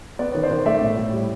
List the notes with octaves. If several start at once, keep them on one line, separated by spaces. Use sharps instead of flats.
B3 D5
D#3 C#5
C5 D5
D#3
A3 D5 E5
A2
A2
G3